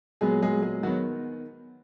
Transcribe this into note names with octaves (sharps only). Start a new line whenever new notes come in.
A#2 F#3 G#3 B3 G#4
G#3 G#4
G#3 G#4
D#3 F#3 B3 F#4